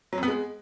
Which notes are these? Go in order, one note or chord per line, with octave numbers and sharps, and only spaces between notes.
F#3
F2
B3
G#3